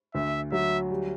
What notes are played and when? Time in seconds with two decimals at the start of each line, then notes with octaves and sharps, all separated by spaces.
0.14 D2 E5
0.52 F#3 E5
0.90 G3